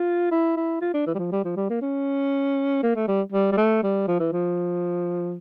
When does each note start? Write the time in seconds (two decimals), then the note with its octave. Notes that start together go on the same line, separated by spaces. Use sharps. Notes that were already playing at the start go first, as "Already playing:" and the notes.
Already playing: F4
0.31 E4
0.57 E4
0.81 F4
0.94 D4
1.06 E3
1.15 G3
1.19 F3
1.32 G3
1.44 F3
1.57 G3
1.70 A#3
1.82 C#4
2.83 A#3
2.96 A3
3.08 G3
3.32 G3
3.52 G3
3.57 A3
3.83 G3
4.08 F3
4.20 E3
4.32 F3